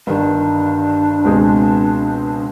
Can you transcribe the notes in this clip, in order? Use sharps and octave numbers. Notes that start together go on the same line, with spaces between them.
G1 G2 D#3 D4
C#2 B2 G#3 C4